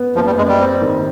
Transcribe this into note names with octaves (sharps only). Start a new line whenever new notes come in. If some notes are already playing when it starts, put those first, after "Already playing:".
Already playing: B3
F#1 F3
G3
F#2 G#3
G3
C4
D#3